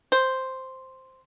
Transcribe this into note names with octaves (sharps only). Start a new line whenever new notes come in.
C5